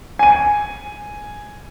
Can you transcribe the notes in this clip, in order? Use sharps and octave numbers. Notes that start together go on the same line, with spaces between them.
G#5 D#7